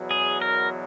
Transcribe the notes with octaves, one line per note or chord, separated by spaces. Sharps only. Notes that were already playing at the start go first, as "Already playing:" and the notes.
Already playing: E2 B2 F#3
G#4
A#4